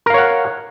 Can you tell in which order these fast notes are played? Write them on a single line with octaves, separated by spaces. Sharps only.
A#4 F5 C#5 F#5